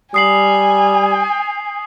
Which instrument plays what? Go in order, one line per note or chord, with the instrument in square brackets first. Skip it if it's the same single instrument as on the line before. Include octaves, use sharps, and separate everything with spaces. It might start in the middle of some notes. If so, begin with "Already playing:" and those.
[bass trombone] G3 [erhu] G#5 [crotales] D#6 C7 F#7